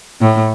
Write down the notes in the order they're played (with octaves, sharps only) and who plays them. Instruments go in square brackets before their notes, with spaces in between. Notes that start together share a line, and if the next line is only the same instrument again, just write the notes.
[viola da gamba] A2